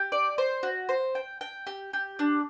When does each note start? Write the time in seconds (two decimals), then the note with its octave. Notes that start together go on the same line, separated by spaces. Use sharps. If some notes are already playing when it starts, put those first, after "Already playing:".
Already playing: G4
0.12 D5
0.38 C5
0.63 F#4
0.89 C5
1.15 G5
1.41 G5
1.67 G4
1.93 G4
2.19 D4